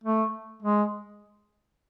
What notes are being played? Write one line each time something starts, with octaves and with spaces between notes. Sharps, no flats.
A3
G#3